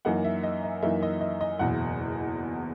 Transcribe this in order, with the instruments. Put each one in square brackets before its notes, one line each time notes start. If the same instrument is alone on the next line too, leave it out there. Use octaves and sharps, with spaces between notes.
[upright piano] F#2 E3 A#3 D#4 F#5
E5
D#5
D#5
F#2 E3 A#3 D#4 E5
D#5
D#5
D#5
F#1 E2 B2 F#5